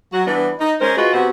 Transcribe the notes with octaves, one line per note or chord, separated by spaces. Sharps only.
F#3 F#4
E3 G3 B3 D4
D#4
G#3 C#4 A#4 C5
F4 F#4 G#4 B4 D#5
C3 B3 C4 F#4